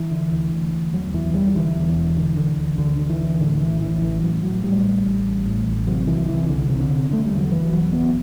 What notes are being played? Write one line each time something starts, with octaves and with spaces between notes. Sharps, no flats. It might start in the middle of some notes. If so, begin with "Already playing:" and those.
Already playing: E3
D3
D2
D2
D2
E2 F#3
E2 E3
E1 G3
D3 E3
E2
E1
D3
D3
D2
D2 D3
D3
E3
D2
A2 D3
A1 E3
A1 E3
A1 E3
A1 F#3
A2 F#3
A2 G3
A1
A1
A1
A2
A1
C3 F#3
C2 E3
C3 E3
C2 D3
C3
D3
C3
D3 A3
G3
E2
F#3
F#1 E3
E2 F#3
F#1 B3